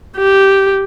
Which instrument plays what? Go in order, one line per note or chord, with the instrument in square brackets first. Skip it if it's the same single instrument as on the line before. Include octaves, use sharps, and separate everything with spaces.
[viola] G4